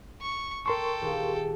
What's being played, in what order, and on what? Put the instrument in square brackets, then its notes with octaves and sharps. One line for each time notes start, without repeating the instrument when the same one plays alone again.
[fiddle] C#6
[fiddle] A4 G5 [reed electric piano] A#4 C6 C#6
[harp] D#1 G4 G#4